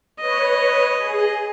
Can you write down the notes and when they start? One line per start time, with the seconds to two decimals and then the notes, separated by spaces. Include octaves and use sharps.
0.20 B4 C#5 D#5
0.97 G#4